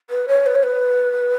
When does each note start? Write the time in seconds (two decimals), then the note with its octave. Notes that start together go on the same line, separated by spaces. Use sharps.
0.09 B4
0.28 C#5
0.46 B4
0.55 C#5
0.63 B4